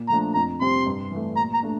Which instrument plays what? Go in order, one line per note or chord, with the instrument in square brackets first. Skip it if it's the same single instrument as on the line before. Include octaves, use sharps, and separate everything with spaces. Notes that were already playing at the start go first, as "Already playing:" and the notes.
Already playing: [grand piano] A#2
[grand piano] F3 A3 D4 [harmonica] A#5
[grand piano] F2 [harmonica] A#5
[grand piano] C3 G3 C4 [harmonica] C6
[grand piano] G2
E3 A3
[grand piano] A#2 [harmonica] A#5
[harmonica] A#5
[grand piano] A3 D4